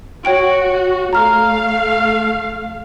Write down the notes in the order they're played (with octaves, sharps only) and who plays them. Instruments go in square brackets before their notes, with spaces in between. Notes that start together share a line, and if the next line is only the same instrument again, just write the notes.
[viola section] F#4 [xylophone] C#5 G5 D7
[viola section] A3 F5 [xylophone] A#5 F6